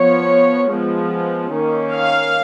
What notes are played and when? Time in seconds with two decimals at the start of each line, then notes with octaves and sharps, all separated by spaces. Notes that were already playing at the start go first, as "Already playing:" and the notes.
Already playing: F3 B3 C#5
0.69 F3 G#3 B3
1.50 D#3 A#3 C#4
1.92 F5